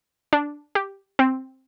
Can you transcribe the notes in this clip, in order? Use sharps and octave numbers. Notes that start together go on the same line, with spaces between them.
D4
G4
C4